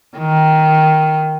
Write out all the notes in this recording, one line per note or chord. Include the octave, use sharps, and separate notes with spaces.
D#3